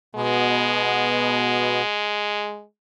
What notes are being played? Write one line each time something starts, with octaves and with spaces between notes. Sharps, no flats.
B2 G#3 B3